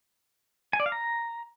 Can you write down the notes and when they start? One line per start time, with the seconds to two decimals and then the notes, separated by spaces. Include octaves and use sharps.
0.73 G#5
0.80 D5
0.86 F5
0.92 A#5